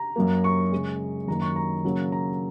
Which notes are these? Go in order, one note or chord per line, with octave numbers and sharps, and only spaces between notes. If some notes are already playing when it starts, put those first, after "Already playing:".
Already playing: A#5
F#2 F#3 A#3
C#6
C#3 G#3
F#2 D#3 A#3 A#5
C#6
A#5
C#3 F#3 A#3
A#5